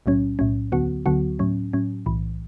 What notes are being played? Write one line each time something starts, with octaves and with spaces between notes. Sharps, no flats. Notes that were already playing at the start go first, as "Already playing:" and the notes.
B1 A2 F#3 C#4
B1 A2 F#3 C#4
D2 D3 F#3 B3 F#4
D2 D3 F#3 B3 F#4
A2 F#3 C#4
A2 F#3 C#4
B1 A2 E3